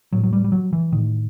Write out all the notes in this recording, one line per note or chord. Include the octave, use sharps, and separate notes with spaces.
A2 F#3
F#3
G3
G3
F#3
E3
A2 D#3